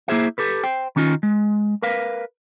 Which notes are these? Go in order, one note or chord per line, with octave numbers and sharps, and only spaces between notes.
A#3 E4 F4 G#4 C5 E5
G4 A4 B4
C5 G5
D#3 C#4 D#4 F4
G#3
A#4 B4 F5